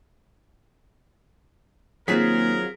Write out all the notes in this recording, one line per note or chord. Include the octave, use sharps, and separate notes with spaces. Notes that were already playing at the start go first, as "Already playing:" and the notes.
D#2 F#3 C4 F4 G#4 A#4 B6